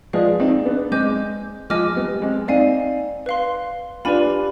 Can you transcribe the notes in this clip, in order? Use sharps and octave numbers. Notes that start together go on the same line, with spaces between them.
F3 G#3 G#4 B4 D5 F5
C4 D#4
B3 D4
G#3 C4 D#5 G#5 D6 G6
F3 G#3 D#5 G#5 D6 F6
G3 B3
G#3 C4
C4 D#4 D5 F5 G#5
B4 F5 C6
D4 F4 G4 B4 D5 G#5 B5